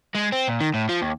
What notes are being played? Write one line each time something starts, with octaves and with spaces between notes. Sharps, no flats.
G#3
C4
A#2
D#3
A2
F3
D#2